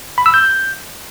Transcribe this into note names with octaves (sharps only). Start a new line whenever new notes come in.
B5
E6
G6